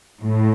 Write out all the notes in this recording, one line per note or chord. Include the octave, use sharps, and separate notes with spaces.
A2